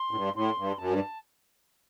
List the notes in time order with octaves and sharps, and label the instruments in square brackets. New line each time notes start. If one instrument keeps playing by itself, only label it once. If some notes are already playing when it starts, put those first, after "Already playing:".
Already playing: [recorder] C6
[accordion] A2
G2
[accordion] A2 [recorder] C6
[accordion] G2
[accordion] F#2 [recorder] A5
[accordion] G2